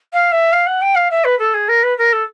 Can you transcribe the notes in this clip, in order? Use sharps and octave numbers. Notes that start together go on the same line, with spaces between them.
F5
E5
F5
F#5
G5
F5
E5
B4
A4
G#4
A#4
B4
A#4
A4